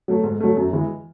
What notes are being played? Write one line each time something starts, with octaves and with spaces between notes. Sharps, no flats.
F#3 A3
G#2
F#3 A3
F#2
E3 G#3